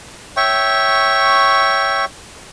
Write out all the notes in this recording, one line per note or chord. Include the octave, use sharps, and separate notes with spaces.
C#5 E5 G5 C#6